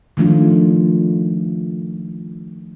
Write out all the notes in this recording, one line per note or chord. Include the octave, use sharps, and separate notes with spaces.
D#3 F3 A3 D4 F4